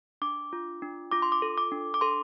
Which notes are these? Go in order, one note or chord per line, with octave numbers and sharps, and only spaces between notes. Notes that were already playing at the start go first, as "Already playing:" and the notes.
D4 D6
F4
D4
F4 D6
C6
D6
A4
D6
D4
D6
A4 C6